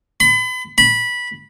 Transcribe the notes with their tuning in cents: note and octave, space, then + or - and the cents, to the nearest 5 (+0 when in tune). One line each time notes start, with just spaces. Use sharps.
B5 +35
B5 -15